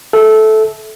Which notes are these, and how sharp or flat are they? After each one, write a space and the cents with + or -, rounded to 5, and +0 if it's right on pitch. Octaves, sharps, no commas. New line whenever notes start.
A4 -15 E5 -10